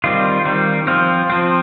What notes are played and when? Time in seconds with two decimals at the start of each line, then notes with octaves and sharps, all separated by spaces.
0.04 D#3 G3 C4 F4
0.45 D#3 G3 C4
0.87 F3 C4 F4
1.30 F3 C4